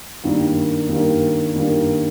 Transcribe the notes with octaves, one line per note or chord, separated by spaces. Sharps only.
G2 D#3 A#3
G2 D#3 A#3
G2 D#3 A#3